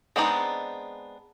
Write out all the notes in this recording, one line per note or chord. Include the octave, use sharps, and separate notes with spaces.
G#3 B3 C4 D4 D#4